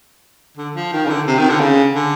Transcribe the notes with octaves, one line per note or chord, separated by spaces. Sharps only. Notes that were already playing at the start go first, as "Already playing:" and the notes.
D3
F3
D#3
C#3
D3
C3
D#3
D3
C#3
D3